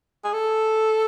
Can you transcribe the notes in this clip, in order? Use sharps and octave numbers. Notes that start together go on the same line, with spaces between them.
G#4
A4